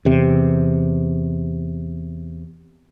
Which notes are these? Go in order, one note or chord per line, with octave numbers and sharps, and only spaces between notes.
E2 C3